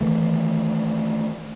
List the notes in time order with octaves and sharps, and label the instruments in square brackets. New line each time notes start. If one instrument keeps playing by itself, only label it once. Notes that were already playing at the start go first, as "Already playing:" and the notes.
[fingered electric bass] D#3 E3 A3